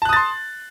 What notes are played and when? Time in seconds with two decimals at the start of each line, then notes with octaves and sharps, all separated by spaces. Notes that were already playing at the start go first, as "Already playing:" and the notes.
0.02 A5
0.05 F#6
0.09 D#6
0.13 A6
0.16 C6